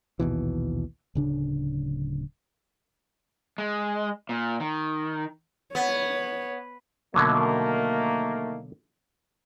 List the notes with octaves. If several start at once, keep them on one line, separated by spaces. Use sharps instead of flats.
A#1 D#2 B2 E3
D1 C#3 D4
G#3
A#2
D#3
B3 C#5
B2 D3 D#3 F#3 A3 A#3